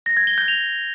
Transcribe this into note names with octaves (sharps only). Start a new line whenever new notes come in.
A#6
G#6
G7
G6
F7